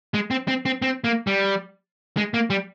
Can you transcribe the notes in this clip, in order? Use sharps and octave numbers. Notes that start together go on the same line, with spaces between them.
G#3
C4
C4
C4
C4
A#3
G3
G#3
A#3
G3